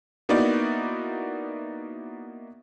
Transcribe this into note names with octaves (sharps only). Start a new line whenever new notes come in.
A#3 B3 D#4 E4 F#4 D5